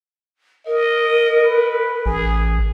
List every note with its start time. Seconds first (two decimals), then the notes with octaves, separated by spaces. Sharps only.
0.66 A#4 D#5
1.44 B4
2.06 A1 G#4